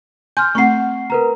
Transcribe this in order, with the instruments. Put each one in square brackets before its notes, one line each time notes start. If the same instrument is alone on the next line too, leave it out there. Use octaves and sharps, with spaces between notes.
[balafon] G#5 C6 [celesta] F6 G6
[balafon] A3 C4 F#5 [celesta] C#6 C7
[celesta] A#4 B4 A#5